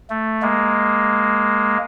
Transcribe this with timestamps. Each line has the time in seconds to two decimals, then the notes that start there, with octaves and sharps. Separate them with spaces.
0.10 A3
0.42 G#3 A#3